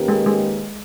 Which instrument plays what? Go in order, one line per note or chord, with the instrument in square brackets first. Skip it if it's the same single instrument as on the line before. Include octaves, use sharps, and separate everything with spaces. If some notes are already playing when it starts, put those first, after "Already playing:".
Already playing: [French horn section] D#3 A#3 C#4 G4 B4
[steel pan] G#3
G#3